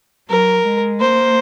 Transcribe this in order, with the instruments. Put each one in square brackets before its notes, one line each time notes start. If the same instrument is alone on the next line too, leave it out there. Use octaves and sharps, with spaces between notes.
[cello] F#3 [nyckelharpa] A#4
[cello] G#3
[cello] A#3 [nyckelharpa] C5